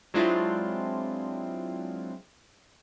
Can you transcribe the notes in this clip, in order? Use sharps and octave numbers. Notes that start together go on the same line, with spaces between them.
F#3 G#3 C4 D4 E4 F4